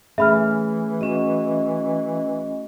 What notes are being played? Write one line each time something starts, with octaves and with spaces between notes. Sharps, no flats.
E3 A3 C#4 G#4 E5 B5 F6
C#4 F#4 D#5